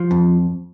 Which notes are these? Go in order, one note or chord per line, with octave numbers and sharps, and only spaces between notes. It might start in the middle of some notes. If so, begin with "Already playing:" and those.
Already playing: F3
F2